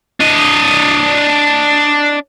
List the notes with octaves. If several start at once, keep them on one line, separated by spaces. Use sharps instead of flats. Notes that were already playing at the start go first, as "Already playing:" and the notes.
D4 D#5